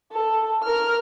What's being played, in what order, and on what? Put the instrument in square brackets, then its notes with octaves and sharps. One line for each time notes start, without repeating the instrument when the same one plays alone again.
[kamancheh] A4
A#4 F6